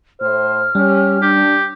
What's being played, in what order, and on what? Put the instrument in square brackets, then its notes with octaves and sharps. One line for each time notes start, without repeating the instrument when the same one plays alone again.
[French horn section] A2 C5 [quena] F6
[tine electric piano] G3 [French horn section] C#4 G4
[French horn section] D4 [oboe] G4